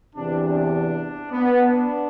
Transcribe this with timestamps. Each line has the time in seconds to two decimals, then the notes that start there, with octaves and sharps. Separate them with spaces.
0.16 E2 C3 E3 D4
0.44 D4
1.32 B3
1.60 D4